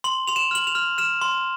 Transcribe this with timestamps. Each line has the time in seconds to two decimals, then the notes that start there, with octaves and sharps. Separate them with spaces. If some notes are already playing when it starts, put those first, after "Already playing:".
0.04 C6 F#7
0.28 C6 F7
0.36 E7
0.51 F6 F#7
0.67 F7
0.75 F6
0.98 F6 E7
1.22 C6